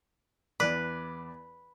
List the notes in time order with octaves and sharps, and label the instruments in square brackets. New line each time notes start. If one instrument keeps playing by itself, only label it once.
[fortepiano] E2 D5 [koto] B4